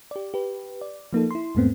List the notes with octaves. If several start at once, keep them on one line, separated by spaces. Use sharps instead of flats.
G4 D5
G4 B4
D5
F3 A#3 D#4 A4
E4 C6
E2 G#2 A3 B3 C4